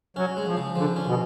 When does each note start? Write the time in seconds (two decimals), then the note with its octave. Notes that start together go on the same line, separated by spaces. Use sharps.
0.16 F#3 C#4
0.37 G#3
0.47 F3
0.57 C#3
0.76 D3 F3
0.96 C#4
1.06 B2